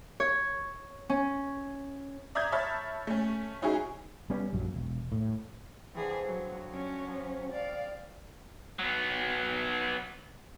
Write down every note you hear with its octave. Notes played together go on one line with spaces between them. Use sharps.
C#5
C#4
D5 E5 A#5 D#6 G6 G#6
C#5 E5 A5 B5 F6 A6
A3 C#4
C#4 D#4 E4 F#4 G#4
G3 B3 C#4
A#1 F#2 F#3
E1
A2
D3 E3 F3 C4 G#4
F#3
F#3 C#4
F3
D5 F5
F#3 B3